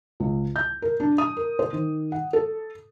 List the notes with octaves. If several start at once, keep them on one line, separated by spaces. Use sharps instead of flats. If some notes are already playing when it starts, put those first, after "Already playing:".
C#2
G6
A#4
D4
D#6
A#4
C5
D#3
F#5
A4